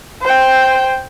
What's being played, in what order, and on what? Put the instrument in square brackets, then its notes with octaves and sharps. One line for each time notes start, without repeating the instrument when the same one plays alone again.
[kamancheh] C5 G5